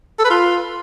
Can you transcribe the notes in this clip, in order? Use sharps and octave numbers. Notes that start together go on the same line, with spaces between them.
A4
B4
F4